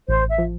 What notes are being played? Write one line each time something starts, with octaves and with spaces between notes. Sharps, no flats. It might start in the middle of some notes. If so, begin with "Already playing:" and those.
A1 C5
E5
F3